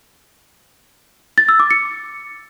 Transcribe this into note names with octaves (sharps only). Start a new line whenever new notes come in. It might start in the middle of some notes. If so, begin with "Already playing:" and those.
A6
E6
D6
C#7